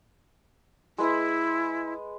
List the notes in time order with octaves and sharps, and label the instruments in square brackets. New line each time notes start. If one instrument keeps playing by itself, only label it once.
[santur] G#3 B4 D#6 [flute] E4